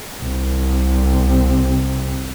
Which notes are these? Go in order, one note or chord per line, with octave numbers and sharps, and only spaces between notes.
C2 C3